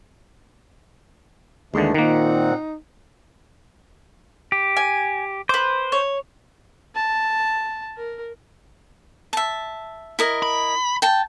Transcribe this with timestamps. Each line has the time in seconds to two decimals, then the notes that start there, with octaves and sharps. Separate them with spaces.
1.74 D#2 D3 E3 G#3 A3 D4
1.94 A#2 D#3 A#3 C4 D#4 F#5
4.52 G4
4.77 G#5
5.49 B4 C5 D6
5.92 C#5
6.95 A5
7.98 A#4
9.33 E5 A5
10.19 E4 A#4 D#5
10.43 B5
11.02 G5 A5